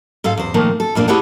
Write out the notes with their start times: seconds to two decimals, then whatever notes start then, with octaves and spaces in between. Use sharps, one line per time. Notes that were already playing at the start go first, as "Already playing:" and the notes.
0.24 G#2 A4 C5 F5
0.38 E2 C5
0.54 A#2 D#3 F3 A3 A#3
0.80 A4
0.95 F2 A#2 A#3 D4
1.08 E4 G4 G#4 C#5 F#5 A5